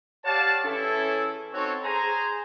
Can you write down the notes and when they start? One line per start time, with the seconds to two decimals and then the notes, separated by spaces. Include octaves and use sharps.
0.25 G4 C#5 D5 F5 F#5 A5
0.65 E3 C#4 E4 G#4 A4
1.53 C4 D#4 F#4 A4 C#5
1.84 G#4 C5 G#5 A#5